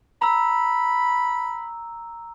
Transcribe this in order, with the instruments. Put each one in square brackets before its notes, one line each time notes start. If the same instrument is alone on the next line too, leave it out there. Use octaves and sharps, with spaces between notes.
[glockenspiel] A#5 E6 [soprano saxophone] B5